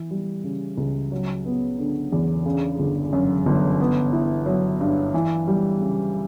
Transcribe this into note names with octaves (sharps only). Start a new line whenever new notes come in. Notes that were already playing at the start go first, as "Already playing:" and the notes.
Already playing: E3
G3
C#3
C#2
F#3
B3
D3
E2
C#3
G1
F#2
G1
B3
E4
F#3
G2
E3
G3
C#3